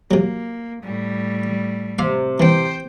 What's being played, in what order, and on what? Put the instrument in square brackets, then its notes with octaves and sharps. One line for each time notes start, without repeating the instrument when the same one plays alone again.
[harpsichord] C3 F#3 [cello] A#3
[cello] A2 G3
[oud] C3 [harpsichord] F5
[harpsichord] E3 C4 [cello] C5 G5